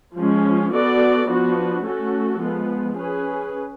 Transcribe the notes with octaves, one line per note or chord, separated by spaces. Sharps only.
F3 G#3 C#4
B3 F#4 A4 D5
F3 B3 D4 F#4
A3 C#4 F#4 A4
F3 G#3 B3
C#4 G#4 B4